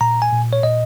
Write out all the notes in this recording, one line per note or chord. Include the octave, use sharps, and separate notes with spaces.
A#2 A#5
G#5
A#2
C#5
A#2 D#5